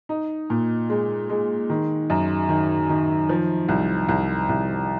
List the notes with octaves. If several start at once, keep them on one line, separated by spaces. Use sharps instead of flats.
D#4
A#2
G#3
G#3
D#3
F#2
D#3
D#3
F3
C2
C2
C2